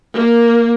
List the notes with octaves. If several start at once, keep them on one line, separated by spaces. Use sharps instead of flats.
A#3